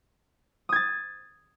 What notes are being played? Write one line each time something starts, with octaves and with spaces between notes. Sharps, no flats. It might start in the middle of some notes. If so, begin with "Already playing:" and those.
D#6 G#6 A6